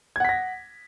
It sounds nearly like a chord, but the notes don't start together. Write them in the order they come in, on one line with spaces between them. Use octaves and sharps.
G#6 F#5 B6 A#6